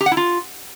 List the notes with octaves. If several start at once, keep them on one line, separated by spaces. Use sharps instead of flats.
G4
F#5
E4
F4